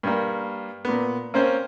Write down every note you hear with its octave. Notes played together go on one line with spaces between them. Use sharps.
G2 G3 A#3
A#2 B3
A#3 C4 C#4 C5